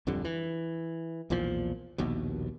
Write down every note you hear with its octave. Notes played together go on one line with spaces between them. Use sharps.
D1 F2 D3 G3
E3
B1 E2 A#2 F3
A#1 D#2 B2